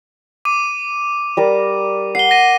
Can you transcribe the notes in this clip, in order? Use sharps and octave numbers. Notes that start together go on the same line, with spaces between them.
D6 D#7
G3 A#4 D5
F#5 C7 G7
A#6 D#7 G7